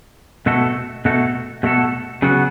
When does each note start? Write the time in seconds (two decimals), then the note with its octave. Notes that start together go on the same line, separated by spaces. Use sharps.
0.46 B2 A3 F#4 A4
1.05 B2 A3 F#4 A4
1.63 B2 A3 F#4 A4
2.22 C#3 F#3 B3 F#4